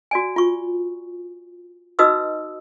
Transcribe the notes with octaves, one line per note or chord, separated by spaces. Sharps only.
F#4 D5 G#5
F4 C#6
D#4 F#4 B4 D#5 D#6 E6